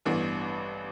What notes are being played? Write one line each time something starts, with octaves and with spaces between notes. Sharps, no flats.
A1 G2 E3 B3 D4